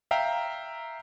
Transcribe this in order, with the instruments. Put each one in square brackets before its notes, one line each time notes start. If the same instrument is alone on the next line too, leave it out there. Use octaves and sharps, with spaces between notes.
[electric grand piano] E5 F5 G5 A#5